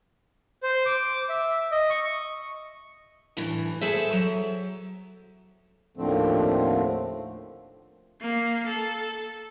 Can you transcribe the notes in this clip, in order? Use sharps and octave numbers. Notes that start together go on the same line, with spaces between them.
C5
D6
E5
D#5
C#6
D2 A2 E3
G#4 A4 C5 E5
F#3
D#2 A2 D3 F3 A3 C4
A#3 C7
A4